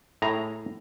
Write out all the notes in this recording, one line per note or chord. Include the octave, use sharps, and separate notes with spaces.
A2 G#4 A#5